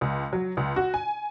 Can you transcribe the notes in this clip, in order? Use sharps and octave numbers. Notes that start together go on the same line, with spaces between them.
C#2
F#3
C#2
F#4
G#5